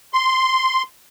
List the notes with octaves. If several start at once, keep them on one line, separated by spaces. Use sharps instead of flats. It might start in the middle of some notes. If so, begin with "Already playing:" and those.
C6